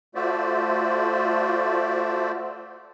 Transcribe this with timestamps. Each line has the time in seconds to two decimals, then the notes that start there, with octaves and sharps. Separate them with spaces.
0.15 A3 F4 F#4 C5 D5 E5